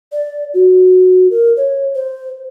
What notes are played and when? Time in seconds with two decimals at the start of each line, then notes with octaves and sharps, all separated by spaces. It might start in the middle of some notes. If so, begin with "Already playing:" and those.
0.12 D5
0.54 F#4
1.30 A#4
1.57 C#5
1.95 C5